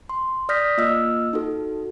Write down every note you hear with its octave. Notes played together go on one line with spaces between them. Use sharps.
C6
D5 D#6 F6 G6 A#6 B6
A#3 F4 D#5 E6 F6
D#4 F#4 A4